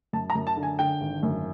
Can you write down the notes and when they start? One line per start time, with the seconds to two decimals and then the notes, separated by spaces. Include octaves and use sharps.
0.13 F#2 A5
0.30 A#5
0.35 F#2
0.47 A5
0.57 D3
0.63 G#5
0.79 D3 G5
1.01 G#1
1.23 F#2